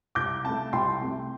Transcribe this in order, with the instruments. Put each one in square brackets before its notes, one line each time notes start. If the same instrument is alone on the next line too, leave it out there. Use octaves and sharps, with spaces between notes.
[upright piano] C2 D6 G6
C3 A3 A5
C2 G5 C6
C3 A3